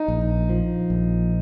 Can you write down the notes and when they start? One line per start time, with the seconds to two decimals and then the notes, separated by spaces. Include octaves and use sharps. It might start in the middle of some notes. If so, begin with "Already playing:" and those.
Already playing: D#4
0.08 A#1
0.49 F3
0.90 A#1